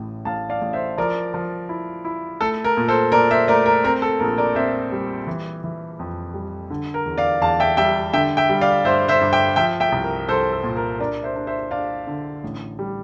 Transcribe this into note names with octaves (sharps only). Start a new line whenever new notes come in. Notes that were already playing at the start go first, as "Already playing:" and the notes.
Already playing: A1 A2
A1 F5 A5
D5 F5
A1
C5 E5
F3 A#4 D5
F3
E4
E4
A3 A4
A#4
A#2
A4 C5
A#2 A#4 D5
C5 E5
A3 A#4 D5
A#4
C4 A#4
A4
A#1 A#4
A#4 D5
C4 C5 E5
G3
E3
E3
F2
G3
D3
A#4
E2
D5 F5
E2 F5 A5
E5 G5
G3 E5 G5
D3 E5 G5
E5 G5
G3
D5 F5
G2 C5 E5
C5 E5
G2
E5 G5
F3 E5 G5
E5 G5
C2
A#4
C2 A4 C5
A4
A#2
A#4
D4 A#4 D5
C5 E5
D4
C5 E5
D4 D5 F5
D3
A1
G3